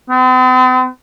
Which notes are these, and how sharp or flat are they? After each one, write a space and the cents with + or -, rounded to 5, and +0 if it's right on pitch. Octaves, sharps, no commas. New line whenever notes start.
C4 -45